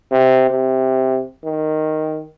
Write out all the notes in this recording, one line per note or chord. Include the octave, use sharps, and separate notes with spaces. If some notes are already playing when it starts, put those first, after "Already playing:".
C3
C3
D#3